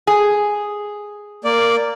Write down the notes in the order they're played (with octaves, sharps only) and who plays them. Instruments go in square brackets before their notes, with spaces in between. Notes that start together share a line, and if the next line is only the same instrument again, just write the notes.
[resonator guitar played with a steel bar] G#4
[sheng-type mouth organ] A#3 D5